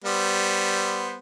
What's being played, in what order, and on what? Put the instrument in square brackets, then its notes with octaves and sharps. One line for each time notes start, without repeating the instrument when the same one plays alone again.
[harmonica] G3 B3 C5